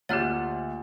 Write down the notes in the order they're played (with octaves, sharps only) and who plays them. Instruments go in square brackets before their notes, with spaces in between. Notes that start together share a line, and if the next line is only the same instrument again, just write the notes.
[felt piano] D2 [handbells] A#3 F4 C#5 [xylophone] G4 F6 A6 [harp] F#5